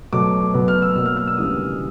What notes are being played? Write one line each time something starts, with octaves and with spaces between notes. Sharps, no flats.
B2 F#3 A3 D6
B2 F#3 B3
F6
E6
B2 F#3 A#3 E6
F6
F6
E6
D2 C#3 E3 G3 B3 D#6